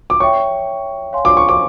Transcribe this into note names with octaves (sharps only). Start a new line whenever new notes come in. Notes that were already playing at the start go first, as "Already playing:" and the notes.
D6
C#5 E5 G5 C#6
C#5 F5 G#5 C6
D6
C#6
D6